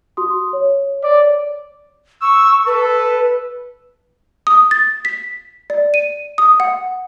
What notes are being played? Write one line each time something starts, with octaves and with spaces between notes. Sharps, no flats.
F#4 C6 D#6
C#5
D5
C#6 E6
A4 B4
D#6
A6
B6
D5
D#7
D#6
F#5